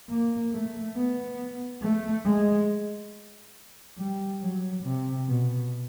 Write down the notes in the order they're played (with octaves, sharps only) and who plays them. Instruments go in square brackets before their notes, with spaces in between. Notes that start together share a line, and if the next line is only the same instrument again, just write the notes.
[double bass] A#3
A3
B3
A3
G#3
G3
F#3
C3
B2